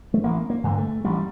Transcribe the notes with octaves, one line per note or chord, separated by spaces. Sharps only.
A3
A1 A#3
A#3
G2 D3
A3
A1 G3